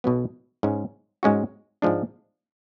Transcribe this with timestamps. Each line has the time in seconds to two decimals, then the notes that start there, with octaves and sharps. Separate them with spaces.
0.04 B1 B2 F#3 B3
0.63 G#2 G#3 C#4
1.23 G#2 G#3 C#4 F#4
1.82 G#2 F3 G#3 D4